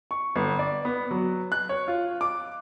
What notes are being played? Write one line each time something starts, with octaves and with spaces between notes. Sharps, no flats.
C#6
G1
D5
B3
F#3
F#6
C#5
F4
D6